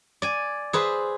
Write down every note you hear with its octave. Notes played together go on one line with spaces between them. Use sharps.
D5 G#5
G#4 B4 C5 E5